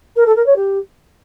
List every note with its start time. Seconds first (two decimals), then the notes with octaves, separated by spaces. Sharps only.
0.16 A#4
0.26 A4
0.36 A#4
0.46 C#5
0.56 G4